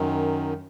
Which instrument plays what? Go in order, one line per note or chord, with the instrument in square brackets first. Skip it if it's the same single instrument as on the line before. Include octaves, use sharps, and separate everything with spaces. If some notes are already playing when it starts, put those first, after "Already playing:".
Already playing: [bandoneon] F#2 D#3